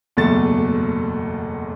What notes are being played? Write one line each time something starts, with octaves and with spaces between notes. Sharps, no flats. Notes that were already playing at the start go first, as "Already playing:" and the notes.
F#1 B1 E2 A3 A5 A6